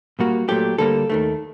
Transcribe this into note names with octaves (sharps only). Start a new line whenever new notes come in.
A#2 G3 A#3 F#4
A#2 F#3 A3 G4
D2 D3 G3 A#3 A4
D#2 D#3 A3